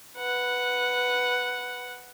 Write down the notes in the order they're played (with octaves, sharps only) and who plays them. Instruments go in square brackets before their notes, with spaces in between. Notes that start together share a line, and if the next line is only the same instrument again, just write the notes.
[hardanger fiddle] B4 F#5